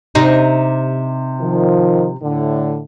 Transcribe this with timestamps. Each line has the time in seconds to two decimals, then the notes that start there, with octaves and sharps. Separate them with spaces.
0.15 C3 D#4
1.41 D#3 F3
2.22 A2 D3